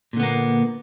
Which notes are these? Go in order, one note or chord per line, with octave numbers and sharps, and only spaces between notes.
A#2 D3 A#3 B3